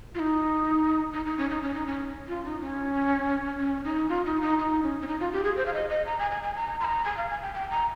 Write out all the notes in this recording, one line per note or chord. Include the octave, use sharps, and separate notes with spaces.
F4
D#4
D#4
D#4
C#4
D#4
C#4
D#4
C#4
F4
D#4
C#4
C#4
D#4
F4
D#4
D#4
D#4
C#4
C#4
D#4
F4
G4
G#4
C5
F5
D#5
D#5
A#5
G#5
G#5
G#5
A#5
C6
A#5
G#5
F5
G#5
G5
G5
A#5